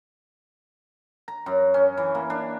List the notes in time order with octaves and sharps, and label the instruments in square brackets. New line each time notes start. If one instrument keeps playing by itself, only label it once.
[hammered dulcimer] A#5
F#2
C#4
E3
A#3
D4